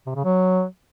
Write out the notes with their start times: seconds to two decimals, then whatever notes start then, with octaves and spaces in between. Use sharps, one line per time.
0.07 C3
0.16 C#3
0.25 F#3